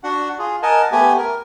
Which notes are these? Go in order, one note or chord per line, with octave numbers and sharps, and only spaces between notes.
D4 F#4 F#5
F4 G#4
A#4 D#5 F#5 G#5 A5
A3 B3 G4 G#5
A#4